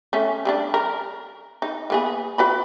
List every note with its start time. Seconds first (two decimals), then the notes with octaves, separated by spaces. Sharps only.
0.13 A3 C#4
0.45 G3 C#4 D4
0.74 A#4
1.62 D#4
1.90 A#3 B3 G#4
2.38 F#4 B4 B5